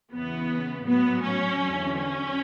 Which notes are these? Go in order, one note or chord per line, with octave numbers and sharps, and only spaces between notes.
E2 C#3 E3 B3
A2 F#3 B3
C#4
E2 D3 F#3
C#4